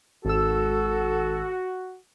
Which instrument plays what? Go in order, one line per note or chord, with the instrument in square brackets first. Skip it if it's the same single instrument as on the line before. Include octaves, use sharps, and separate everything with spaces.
[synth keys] G#1 E6 [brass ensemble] F#4 [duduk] A4